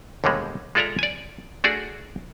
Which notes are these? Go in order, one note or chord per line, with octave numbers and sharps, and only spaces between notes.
D#2 B2 D3 G3 G#3
G#3 F4 A4 D5 E5 A#5
D5 G#5
A3 D4 F#4 G#4 D5